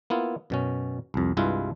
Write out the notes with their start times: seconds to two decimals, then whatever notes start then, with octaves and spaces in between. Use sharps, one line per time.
0.10 A#3 B3 E4 F4
0.50 F#2 B2 C#4
1.14 C2 F2
1.37 C2 G2 G#3 E4 F4 B4